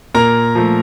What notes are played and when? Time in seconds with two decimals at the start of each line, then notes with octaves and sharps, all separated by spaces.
0.15 A#2 A#4 A#5
0.55 F3 A3